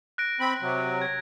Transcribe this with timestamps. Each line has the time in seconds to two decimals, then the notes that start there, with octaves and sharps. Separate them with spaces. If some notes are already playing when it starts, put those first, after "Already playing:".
0.18 F#6 A#6 D7
0.40 C4 B5
0.61 C3 F#3
1.02 G#6 A#6